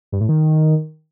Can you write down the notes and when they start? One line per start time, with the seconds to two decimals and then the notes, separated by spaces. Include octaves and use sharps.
0.12 G2
0.21 A2
0.29 D#3